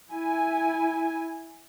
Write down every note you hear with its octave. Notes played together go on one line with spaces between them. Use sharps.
E4 G#5